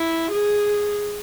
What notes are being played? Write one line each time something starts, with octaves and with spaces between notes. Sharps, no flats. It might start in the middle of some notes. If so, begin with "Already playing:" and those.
Already playing: E4
G#4